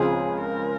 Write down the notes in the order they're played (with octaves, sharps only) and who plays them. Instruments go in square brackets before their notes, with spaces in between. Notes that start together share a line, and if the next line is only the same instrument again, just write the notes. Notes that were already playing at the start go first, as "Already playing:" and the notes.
Already playing: [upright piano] C#2 C#3 F3 G#3 C4 [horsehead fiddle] G#4
[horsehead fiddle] A#4